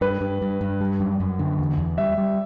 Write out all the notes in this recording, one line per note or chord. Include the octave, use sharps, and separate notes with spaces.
G2 B4
G2
G2
G2
G3
F#2
F#2
D3
E2
E2
G3 E5
G3